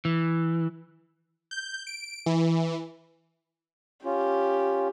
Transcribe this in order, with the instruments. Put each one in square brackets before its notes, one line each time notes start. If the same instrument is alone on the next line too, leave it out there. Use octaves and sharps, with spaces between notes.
[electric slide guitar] E3
[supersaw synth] G6
D7
E3
[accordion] C#4 F4 [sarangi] G4